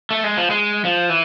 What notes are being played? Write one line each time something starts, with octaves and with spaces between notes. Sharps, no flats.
A3
G#3
F3
G#3
F3
E3